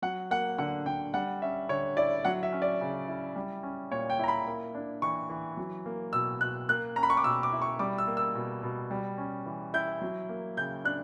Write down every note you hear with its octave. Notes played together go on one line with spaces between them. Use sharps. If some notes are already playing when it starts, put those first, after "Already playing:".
F#3 F#5
A#3 F#5
D3 F#5
D3 G5
G3 F#5
C#4 E5
D3 C#5
E4 D5
F#3 F#5
E5
C#4
D5
C#3
E4
G3
C#4
A#2 C#5
G5
E4 A#5
B5
A#3
D4
E3 C#6
E3
F#3
A#3
B2 E6
B2 F#6
A#3 F#6
C#4 A#5
B5
C#6
D6
B2 E6
D6
E4
C#6
G3 D6
E6
A#3
E6
B2
B2
G3
C#4
E3
E4 G6
F#3
A#3
C#3 G6
D4 F#6